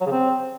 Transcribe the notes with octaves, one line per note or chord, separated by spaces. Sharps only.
F#3
C#3
C4